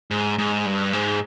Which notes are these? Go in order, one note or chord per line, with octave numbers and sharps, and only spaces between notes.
G#2
G#2
G2
G#2